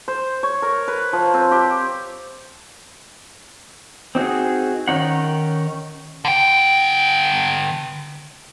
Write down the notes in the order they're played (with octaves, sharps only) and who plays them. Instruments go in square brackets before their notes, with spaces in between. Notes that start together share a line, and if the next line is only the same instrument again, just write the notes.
[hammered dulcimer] C5
C#5
A#4
B4
F3
C4
G4
[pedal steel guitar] C4 D#4 F#4 G#4
D#3 C#4 D#4 F#5
[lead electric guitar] D3 G5